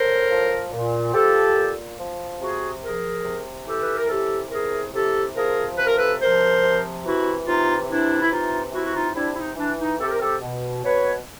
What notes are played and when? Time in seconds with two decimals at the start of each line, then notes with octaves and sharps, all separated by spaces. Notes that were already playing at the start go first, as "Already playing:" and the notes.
Already playing: A2 A#4 C5
0.29 F3
0.71 A#2
1.13 F3 G4 A4
1.55 A#2
1.97 F3
2.40 C3 F#4 G#4
2.81 F3 G#4 A#4
3.24 C3
3.66 E3 G4 A4
3.82 B4
3.96 A#4
4.08 C3 G4 A4
4.50 E3 G#4 A#4
4.92 C3 G4 A4
5.35 F3 G#4 A#4
5.77 C3 B4
5.86 A#4
5.96 A4 B4
6.19 F3 A#4 C5
6.62 C3
7.03 E3 E4 F#4
7.46 C3 D#4 F4
7.88 E3 D4 E4
8.21 E4
8.30 C3 D#4 F4
8.72 E3 E4 F#4
8.85 F#4
8.93 D#4 F4
9.14 C3 D4 E4
9.32 E4
9.36 D#4
9.56 E3 D4
9.78 D#4
9.99 C3 G4 A4
10.09 A#4
10.20 G4 A4
10.41 B2
10.84 B2 B4 C#5